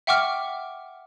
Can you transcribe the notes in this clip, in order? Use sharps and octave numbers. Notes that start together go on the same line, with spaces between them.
E5 F#5 G5 C#6 D6 F6